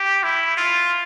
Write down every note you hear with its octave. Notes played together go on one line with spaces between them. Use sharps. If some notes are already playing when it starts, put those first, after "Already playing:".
Already playing: G4
E4
F4